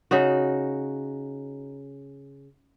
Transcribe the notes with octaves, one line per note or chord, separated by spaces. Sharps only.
C#3 D#4 F#4